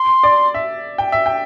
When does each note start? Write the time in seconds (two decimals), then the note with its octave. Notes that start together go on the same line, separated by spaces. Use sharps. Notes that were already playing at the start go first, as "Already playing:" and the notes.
Already playing: C6
0.23 D5
0.54 E5
0.98 G5
1.12 E5
1.26 G5